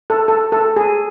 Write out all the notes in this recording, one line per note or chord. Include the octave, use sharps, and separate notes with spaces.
A4
A4
A4
G#4